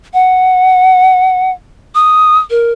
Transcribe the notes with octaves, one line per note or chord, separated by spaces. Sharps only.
F#5
D#6
A#4